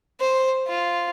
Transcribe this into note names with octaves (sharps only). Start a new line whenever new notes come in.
C5
F4